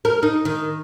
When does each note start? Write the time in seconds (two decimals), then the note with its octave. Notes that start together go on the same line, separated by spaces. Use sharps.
0.05 A#4
0.23 D#4
0.45 D#3